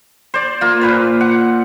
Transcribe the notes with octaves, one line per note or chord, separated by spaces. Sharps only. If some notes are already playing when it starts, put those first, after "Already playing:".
C5 D5
A#3 F4
A#2 B4 C5
F#5